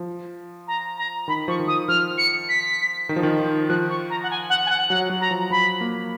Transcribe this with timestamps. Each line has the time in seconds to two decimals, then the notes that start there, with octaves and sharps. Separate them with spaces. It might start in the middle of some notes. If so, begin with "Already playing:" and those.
Already playing: F3
0.67 A#5
0.97 A#5
1.28 D#3 B5
1.48 F3 C#6
1.60 D#3
1.67 F3 D#6
1.88 F3 F6
2.18 C#7
2.49 B6
3.09 D#3
3.16 F3
3.23 D#3
3.39 F3
3.69 F3 F#6
3.90 C#6
4.10 A#5
4.23 F#5
4.30 G#5
4.49 F#5
4.66 G#5
4.70 F#5
4.90 F#3 F#5
5.10 F#3
5.21 A#5
5.31 F3
5.50 F3 B5
5.81 A#3